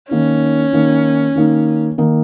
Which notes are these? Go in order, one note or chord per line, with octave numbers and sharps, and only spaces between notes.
D#3 A#3 C#4 D#4
D#3 A#3 D#4
D#3 A#3 D#4
D#3 A#3 D#4